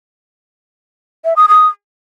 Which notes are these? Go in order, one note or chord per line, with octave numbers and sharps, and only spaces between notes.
E5
D#6
D#6